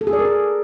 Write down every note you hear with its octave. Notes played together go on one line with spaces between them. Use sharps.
A4
G#4
D5
A#4
G#4